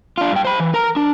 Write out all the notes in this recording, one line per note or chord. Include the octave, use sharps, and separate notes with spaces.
D4 F4
G2 G5
C5 B5
E3
A#4 A#5
D4